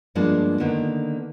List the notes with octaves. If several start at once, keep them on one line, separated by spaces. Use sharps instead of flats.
G2 F3 G#3 A#3 B3 D4
D3 D#3 A#3 B3 D#4